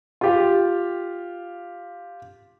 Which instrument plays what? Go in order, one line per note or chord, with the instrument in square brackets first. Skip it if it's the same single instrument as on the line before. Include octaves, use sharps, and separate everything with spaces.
[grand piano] F4 G4